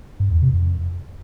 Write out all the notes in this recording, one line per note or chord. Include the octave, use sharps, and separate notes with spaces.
G2
E2
C3
F2